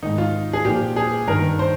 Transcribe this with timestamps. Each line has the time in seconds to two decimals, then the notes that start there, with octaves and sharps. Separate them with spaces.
0.03 G#2 D#3 D#4
0.18 F4
0.53 G#4
0.65 A#2 F3 G4
0.96 G#4
1.27 G2 D#3 A#4
1.59 C5